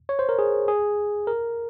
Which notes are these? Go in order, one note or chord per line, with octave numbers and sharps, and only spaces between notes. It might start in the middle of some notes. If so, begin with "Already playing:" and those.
C#5
C5
A#4
G#4
G#4
A#4